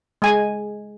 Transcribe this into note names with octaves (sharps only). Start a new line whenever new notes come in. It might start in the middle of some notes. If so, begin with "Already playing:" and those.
G#3 G#5